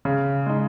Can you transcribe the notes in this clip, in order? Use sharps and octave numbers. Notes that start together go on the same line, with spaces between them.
C#3
G#3 D#4